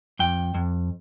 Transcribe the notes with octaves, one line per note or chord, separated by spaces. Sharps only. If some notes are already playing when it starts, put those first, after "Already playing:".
F2 G5
F2